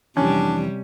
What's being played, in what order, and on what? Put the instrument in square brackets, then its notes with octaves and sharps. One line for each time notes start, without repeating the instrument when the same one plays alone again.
[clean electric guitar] F2 E3 [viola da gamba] C3 G3 [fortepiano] C#4 [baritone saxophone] D4